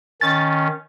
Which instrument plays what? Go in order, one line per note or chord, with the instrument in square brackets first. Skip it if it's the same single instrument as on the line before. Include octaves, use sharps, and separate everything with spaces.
[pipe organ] D#3 C#4 [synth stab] A6